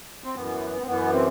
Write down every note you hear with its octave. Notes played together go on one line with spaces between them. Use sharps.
C4
F#2 E3 B3
C4
F#2 E3 B3
C4